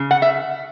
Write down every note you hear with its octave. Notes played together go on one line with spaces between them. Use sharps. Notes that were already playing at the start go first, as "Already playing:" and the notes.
Already playing: C#3
F#5
E5